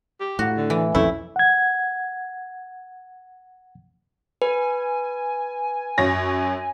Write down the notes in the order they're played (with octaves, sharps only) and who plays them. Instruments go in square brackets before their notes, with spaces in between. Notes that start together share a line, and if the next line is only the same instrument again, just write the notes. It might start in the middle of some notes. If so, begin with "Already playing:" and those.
[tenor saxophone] G4
[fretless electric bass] A2 [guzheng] F#4
[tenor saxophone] D3
[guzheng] E3
[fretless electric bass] B1 F2 C#4 [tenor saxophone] A3 [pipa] E4
[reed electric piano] F#5 G#6
[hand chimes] B4 [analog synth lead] G#5
[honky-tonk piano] F#2 C#5 A#6